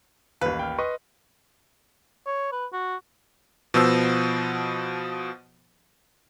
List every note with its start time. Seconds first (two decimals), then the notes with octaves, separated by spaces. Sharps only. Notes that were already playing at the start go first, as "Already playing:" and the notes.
0.41 A1 D#2 B4
0.59 G5 F6
0.79 B4 D#5 C6 C#6
2.26 C#5
2.52 B4
2.73 F#4
3.74 B2 F3 B3 C5 E6